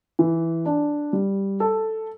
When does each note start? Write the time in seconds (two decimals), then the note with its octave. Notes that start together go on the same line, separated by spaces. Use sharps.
0.19 E3
0.66 D4
1.13 G3
1.60 A4